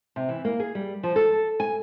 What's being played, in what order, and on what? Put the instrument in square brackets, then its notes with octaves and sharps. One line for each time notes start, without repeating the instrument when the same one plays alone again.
[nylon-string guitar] C3
E3
A#3
G#4
G3
F3
A4
G#5